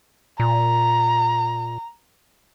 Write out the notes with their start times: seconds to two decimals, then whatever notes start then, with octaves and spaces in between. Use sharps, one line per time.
0.40 A#2 A#5